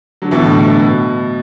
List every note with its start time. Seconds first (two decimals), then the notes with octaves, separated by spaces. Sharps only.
0.22 D3 F#3
0.31 B2 E3
0.41 A2 D3
0.51 A2
0.66 B2
0.82 B2